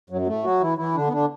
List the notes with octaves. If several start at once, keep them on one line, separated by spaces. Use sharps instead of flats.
F#2 F#3
F#3
A2 A3
F#3 F#4
E3 E4
E3 E4
D3 D4
B3
D3 D4